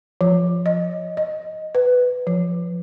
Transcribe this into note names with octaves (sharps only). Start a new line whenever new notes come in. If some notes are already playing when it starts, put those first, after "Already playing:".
F3
D#5
D#5
B4
F3